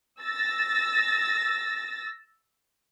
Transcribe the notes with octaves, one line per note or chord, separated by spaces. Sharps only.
E6 A6 A#6